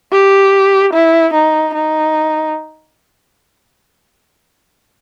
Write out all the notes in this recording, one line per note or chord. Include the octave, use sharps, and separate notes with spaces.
G4
E4
D#4
D#4